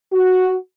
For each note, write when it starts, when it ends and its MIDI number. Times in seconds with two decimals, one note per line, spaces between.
0.13 0.55 66